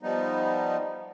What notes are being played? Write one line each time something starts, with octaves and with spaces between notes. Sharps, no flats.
F3 G3 B3 D#4